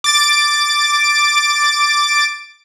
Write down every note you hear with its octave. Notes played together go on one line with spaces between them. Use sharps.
D6 A6 D7